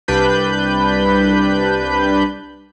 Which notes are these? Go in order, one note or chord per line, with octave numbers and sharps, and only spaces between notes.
C2 G3 D4 B4 B5 G6